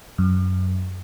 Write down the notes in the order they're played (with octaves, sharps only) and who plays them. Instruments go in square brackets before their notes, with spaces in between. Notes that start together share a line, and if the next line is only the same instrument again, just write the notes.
[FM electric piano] F#2